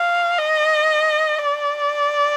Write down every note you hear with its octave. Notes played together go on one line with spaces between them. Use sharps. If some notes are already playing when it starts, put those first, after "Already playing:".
Already playing: F5
D#5
D5